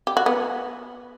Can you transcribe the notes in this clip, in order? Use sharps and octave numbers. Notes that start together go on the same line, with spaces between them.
G4
F#4
B3